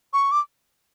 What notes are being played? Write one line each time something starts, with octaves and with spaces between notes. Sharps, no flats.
C#6
D6